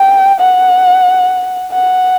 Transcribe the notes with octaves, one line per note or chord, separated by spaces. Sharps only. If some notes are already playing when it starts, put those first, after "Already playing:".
Already playing: G5
F#5
F#5